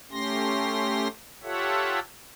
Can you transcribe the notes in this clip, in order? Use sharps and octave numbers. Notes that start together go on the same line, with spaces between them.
A3 C#4 G4 C6 A#6
F4 G4 A4 C#5 E5 F#5